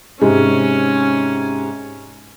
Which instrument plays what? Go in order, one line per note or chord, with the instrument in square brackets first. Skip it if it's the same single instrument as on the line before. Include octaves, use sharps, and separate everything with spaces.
[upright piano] G#2 C3 G#3 [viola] C#4